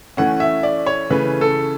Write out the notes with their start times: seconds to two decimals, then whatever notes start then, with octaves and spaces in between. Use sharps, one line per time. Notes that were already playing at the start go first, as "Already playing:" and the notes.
0.17 E3 A3 C#4 F#5
0.40 E5
0.63 D5
0.87 C#5
1.10 C#3 E3 A3 C#4 B4
1.41 A4